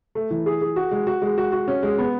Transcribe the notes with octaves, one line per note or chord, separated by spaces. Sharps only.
A3
E3
G#4
G#4
F#4
G#3
F#4
G#3
F#4
F#4
C#4
G#3
B3